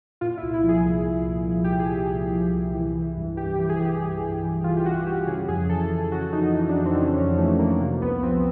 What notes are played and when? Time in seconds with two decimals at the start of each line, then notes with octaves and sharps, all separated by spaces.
0.21 A#2 F4
0.37 E4
0.42 C2
0.54 E4
0.64 F3
0.69 G#4
0.85 C2
1.06 A#2
1.27 C2
1.48 F3
1.64 G4
1.69 C2
1.79 G#4
1.90 A#2
1.95 G4
2.11 C2
2.32 F3
2.54 C2
2.74 E3
2.95 E3
3.17 G2
3.37 G2 G4
3.54 G4
3.59 E3
3.69 G#4
3.79 E3
3.85 G4
4.01 G2
4.22 G2
4.43 E3
4.64 E3 F4
4.77 G4
4.85 G2 F#4
5.07 G2 G4
5.27 C#3 G#4
5.48 F2 G#4
5.69 E3 A4
5.91 F2 G#4
6.11 C#3 F#4
6.33 F2 D#4
6.54 E3 D#4
6.69 D4
6.75 F2
6.86 C4
6.96 C#3
7.02 C#4
7.17 F2 C#4
7.38 E3 A3
7.59 F2 A#3
7.80 C3 A#3
8.01 C2 B3
8.23 F3 C4